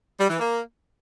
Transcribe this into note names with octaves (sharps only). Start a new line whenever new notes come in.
G3
E3
A#3